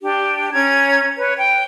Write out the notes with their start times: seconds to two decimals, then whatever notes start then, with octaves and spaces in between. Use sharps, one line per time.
0.01 D4 G4
0.53 C#4 A#5 G#6
1.17 B4 C#5
1.39 G5